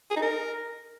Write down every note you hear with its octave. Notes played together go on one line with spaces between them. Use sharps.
G#4
D#4
A#4